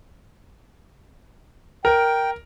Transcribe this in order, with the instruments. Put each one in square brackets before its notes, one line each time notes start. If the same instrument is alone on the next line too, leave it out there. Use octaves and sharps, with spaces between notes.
[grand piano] A#4 [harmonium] G5